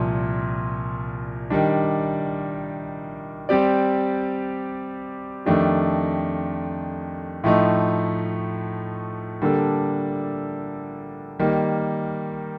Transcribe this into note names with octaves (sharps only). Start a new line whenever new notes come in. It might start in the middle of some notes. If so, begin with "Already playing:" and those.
Already playing: C2 A#2 F3
D#3 G3 D4
G3 C4 G4 D5
F2 D#3 A3 D4 G4
A2 F3 A3 D#4
D3 G3 A#3 D4 A4
D#3 G3 A#3